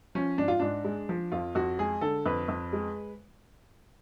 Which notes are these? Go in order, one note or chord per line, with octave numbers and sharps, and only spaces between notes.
F3 C#4
G#2 D4
F4
G#2 D4
G#3
F3
F2 F4
F2 F#4
G#3 G#4
D3 A4
F2 B4
F2
G#3